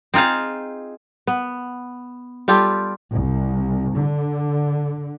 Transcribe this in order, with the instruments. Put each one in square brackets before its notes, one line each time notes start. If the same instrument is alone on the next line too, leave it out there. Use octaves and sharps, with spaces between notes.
[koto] C4 D#4 F4 G#4 F5
[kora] B3
G3 F4 G4 A4
[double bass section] C2
D3